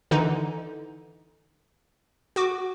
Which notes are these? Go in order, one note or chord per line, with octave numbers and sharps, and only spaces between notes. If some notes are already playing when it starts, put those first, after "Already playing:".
D3 E3 D#4
F#4 D6